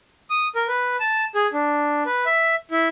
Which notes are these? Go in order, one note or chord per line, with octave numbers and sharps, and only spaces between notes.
D#6
A#4
B4
A5
G#4
D4
B4
E5
E4